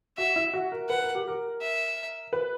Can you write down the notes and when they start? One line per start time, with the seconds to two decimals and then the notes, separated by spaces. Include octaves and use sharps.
0.18 F#4 E5
0.36 E4
0.54 F#4
0.72 A#4
0.89 B4 F#5
1.03 A#4
1.15 G4
1.28 A#4
1.62 E5
2.33 B4